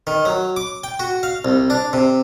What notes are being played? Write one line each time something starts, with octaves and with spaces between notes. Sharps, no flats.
D#3
F#3
D6
G5
F#4
F5
C2
D4
C3